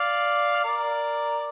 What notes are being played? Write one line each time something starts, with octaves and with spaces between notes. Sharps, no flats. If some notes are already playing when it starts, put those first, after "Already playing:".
Already playing: D5 F5
A#4 D5